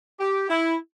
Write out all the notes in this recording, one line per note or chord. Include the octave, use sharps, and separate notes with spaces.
G4
E4